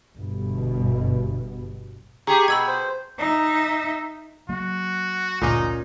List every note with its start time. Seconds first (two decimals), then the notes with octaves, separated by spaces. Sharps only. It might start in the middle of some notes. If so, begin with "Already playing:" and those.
0.16 G1 G2 B2
2.27 G4 G#4 A#5 C#6
2.48 B2 B5 E6 G#6
2.68 C5
3.18 D#4 E5
4.49 F#3 A#3 F#4
5.42 G1 D2 A#2 C#4 D#4